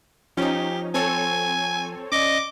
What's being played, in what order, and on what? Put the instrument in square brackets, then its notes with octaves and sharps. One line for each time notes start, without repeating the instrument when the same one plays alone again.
[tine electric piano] F3 [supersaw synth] C#4 D#4 [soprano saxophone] G4
[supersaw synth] C4 A4 C#5 [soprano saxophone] G#5
[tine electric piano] C#4 D5 [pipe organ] D#5 [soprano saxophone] D6